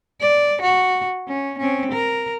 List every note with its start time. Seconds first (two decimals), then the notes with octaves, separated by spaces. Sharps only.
0.20 D5
0.62 F#4
1.28 C#4
1.59 C4 C#4
1.91 A#4